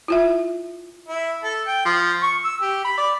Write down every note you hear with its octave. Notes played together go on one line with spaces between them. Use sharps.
E4 F4 E5
E4
A4
G5
F3
C#6
E6
G4
B5
D5